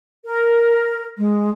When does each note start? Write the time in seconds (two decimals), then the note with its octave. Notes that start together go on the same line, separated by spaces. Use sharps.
0.25 A#4
1.18 G#3